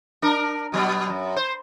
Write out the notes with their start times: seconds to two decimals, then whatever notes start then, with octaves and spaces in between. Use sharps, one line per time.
0.22 D4 A#4
0.72 B2 F#3 B3
1.09 F#2
1.36 C5